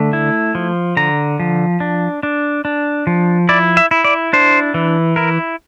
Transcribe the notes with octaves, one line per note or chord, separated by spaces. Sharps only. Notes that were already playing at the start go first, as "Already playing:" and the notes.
Already playing: D3 A3
E4
F3
D3 A#5
F3
D4
D4
D4
F3
E4 D5
E5
E4
D5
D4 C5
E3
E4 A#4